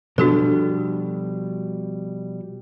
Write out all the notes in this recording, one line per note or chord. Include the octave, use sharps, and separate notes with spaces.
B2 F3 G3 D4 F#4 A4